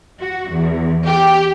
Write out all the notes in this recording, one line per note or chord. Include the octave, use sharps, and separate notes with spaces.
F#4
E2
G4